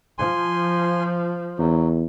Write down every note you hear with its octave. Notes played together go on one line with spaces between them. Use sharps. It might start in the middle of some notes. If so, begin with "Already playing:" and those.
F3 G#5 C6
E2 F#3